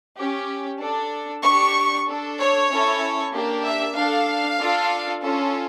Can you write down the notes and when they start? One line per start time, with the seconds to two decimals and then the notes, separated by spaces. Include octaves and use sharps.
0.17 C#4 G4
0.80 D4 A4
1.43 D4 G4 C#6
2.07 D4 A4
2.38 C#5
2.69 C#4 E4 A4
3.33 A#3 D4 G4
3.65 E5
3.96 D4 A4 F5
4.60 D4 F4 A4
5.23 C#4 F4 A4